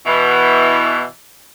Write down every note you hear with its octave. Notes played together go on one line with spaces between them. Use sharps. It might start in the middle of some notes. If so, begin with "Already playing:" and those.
B2 E3